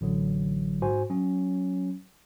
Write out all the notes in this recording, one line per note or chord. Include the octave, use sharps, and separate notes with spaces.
A1 D3 F#3
G#2 F#4 C5 G#5
F#3 C#4